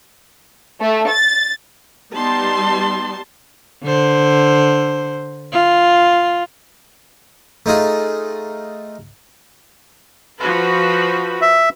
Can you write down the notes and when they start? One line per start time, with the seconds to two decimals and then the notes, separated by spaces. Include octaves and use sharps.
0.80 A3
1.10 A6
2.14 G3 B3 D#4 A5 C6
3.83 D3 C5
5.52 F4
7.66 A3 D#4 F4 G#4
10.39 F3 F#4 B4
11.41 E5